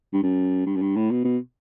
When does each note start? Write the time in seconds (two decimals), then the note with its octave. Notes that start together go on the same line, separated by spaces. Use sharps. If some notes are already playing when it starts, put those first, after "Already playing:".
0.13 G2
0.23 F#2
0.66 G2
0.76 F#2
0.82 G2
0.96 A2
1.11 B2
1.25 B2